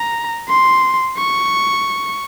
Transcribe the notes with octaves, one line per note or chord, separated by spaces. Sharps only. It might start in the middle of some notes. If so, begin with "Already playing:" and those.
Already playing: A#5
C6
C#6